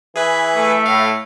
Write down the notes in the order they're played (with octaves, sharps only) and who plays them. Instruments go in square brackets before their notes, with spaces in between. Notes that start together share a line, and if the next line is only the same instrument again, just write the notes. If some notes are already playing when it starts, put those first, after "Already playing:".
[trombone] E3 [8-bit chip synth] G#4 B4 [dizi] E5
[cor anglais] A3
[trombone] A2 [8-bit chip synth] F5